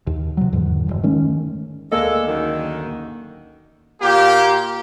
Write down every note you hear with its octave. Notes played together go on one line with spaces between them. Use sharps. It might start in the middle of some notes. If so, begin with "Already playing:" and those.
D#2
C3 F#3
E2 G#2 D3 D#3
E1 B1 G2
D#3 G#3 A3 C#4
D2 G#3 A#3 D4 A4 D#5
F#2 D3 D#3
A#2 A#3 G4